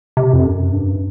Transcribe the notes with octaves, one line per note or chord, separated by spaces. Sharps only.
C3
F2
F#2
G2